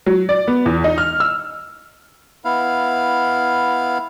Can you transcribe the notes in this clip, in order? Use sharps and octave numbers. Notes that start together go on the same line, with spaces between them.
F#3
D5
B3
E2
D#4
F6
E6
B3 E4 F5